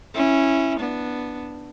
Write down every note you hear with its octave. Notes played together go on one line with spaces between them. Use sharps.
C#4 E4
B3 D4